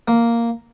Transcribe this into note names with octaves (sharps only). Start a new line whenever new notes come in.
A#3